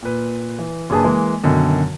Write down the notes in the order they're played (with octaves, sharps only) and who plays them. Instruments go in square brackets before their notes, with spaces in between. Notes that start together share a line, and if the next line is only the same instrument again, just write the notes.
[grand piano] A#2 B4
E3
F#1 D4 G#4 B4 A5
E3 G#3 A#3
F#2 B2 D3 D#3